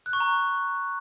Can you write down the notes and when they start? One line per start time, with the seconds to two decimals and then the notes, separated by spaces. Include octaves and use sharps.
0.06 F#6
0.13 C#6
0.20 A#5